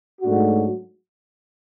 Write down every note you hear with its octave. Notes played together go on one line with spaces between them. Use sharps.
G#2 F#3 A3 D4 F#4